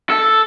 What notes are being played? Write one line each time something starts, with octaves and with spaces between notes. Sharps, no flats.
A4